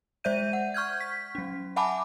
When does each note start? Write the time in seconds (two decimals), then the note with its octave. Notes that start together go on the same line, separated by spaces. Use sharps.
0.24 G#3 C5 D5 E5 G6 D#7
0.53 F#5
0.74 C#6 F6 G6 G#6
1.00 B6
1.35 F#3 C#4
1.76 E5 F#5 G#5 A5 B5 D6